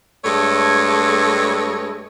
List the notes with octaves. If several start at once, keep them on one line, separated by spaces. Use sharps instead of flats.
G2 G#3 A3 C#5